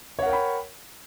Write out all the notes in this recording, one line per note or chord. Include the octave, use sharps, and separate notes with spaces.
A#4 C#5 F#5 G5 B5